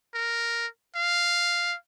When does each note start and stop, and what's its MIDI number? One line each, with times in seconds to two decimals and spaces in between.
0.14 0.67 70
0.96 1.76 77